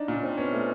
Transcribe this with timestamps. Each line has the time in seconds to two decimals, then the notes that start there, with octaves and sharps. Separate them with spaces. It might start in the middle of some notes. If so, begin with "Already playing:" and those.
Already playing: D4 D#4
0.08 A#2
0.13 C#4
0.23 C4
0.38 B3 C#4
0.53 A3